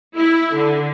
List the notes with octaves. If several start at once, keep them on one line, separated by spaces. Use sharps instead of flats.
E4
D3